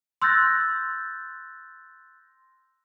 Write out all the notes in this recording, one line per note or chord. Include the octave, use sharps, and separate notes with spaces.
C6 E6 F#6 G6 A6 A#6